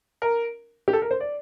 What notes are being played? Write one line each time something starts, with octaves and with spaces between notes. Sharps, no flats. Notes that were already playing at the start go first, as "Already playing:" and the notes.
A#4
G4
A4
A#4
C5
D5